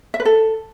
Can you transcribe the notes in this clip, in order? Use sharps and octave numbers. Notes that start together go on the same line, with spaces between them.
E5
B4
A4